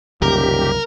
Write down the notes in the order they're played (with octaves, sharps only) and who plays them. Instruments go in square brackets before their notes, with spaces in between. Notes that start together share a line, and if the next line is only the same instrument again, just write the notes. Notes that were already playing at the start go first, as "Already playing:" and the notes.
[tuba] D#1 [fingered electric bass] C2 F#2 C#3 [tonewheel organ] G4 [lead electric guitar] A#4